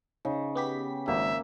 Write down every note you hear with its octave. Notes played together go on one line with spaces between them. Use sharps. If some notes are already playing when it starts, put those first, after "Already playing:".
C#3 D#4
B3 G4 B6
G#1 A#3 E5